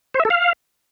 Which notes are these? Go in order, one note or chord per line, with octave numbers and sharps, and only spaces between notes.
C5
E5
A4
F5